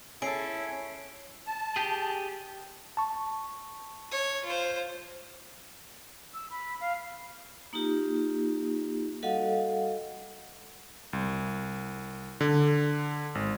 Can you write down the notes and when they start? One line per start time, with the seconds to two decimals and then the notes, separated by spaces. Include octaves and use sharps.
0.22 C#4 E4 G#4 A4 C7 D7
1.46 A5
1.76 G4 G#4
2.97 A5 C#6
4.11 C#5
4.45 F4 C5
6.34 E6
6.50 B5
6.81 F5
7.73 A#3 D#4 F4 G4
9.23 G3 F#4 A4 D#5 F5 F#5
11.13 C2
12.41 D3
13.35 G#1